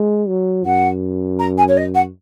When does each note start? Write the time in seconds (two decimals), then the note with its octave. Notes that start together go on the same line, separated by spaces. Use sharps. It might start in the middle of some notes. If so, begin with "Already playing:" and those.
Already playing: G#3
0.28 F#3
0.65 F#2 F#5
1.39 A#5
1.57 G#5
1.68 C#5
1.77 D#5
1.95 F#5